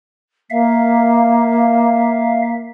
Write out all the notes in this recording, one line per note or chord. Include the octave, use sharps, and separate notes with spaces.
A#3 E5 F5